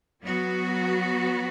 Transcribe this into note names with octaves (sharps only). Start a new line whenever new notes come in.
F#3 B3 F#4